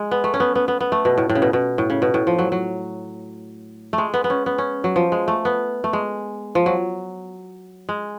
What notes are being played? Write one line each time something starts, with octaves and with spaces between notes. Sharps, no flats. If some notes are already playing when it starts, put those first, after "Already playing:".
Already playing: G#3
B3
A3
C#4
B3
B3
B3
B3
A3
B2
A2
A2
C#3
B2
B2
A2
C#3
B2
A2
F3
F#3
F#3
A3
G#3
B3
B3
C#4
B3
C#4
F#3
F3
G#3
A3
B3
A3
G#3
F3
F#3
G#3